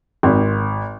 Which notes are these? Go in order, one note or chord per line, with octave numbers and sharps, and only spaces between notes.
G#1